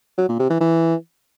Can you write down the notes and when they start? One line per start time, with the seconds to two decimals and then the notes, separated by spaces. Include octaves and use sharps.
0.18 F#3
0.29 A#2
0.39 C3
0.50 E3
0.61 E3